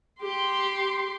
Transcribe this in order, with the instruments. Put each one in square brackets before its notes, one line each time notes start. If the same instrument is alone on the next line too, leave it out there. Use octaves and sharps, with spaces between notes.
[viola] G4 C6